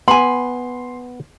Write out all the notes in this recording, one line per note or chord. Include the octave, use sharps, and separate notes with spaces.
B3 G#5 B5 C6